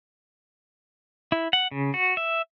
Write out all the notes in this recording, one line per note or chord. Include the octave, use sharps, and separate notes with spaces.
E4
F#5
C#3
F#4
E5